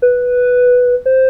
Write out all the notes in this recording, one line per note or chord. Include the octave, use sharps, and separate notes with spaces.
B4
C5